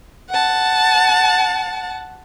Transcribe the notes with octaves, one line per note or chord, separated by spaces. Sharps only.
F#5 A5